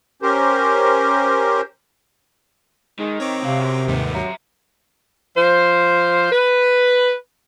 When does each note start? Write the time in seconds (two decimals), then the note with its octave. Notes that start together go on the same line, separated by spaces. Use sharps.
0.22 C#4 G4 A#4 C5
2.99 D#3 G#3
3.20 C4 C#5 A#5 D6
3.42 G#2 C3 F5
3.59 F#2
3.88 D#2 G#2 D#3 G3 B3
4.14 F#3 E5 A#5
5.36 F3 C5
6.31 B4